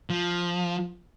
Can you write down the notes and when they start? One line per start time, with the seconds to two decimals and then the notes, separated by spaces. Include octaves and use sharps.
0.10 F3